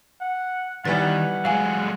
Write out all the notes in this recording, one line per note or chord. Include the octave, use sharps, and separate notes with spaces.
F#5
D#3 E3 G3 B3 B4 F#5 A6
F#3 G#3 F5 G#5